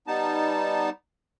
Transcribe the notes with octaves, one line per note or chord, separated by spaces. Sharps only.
G3 B3 D#4 A5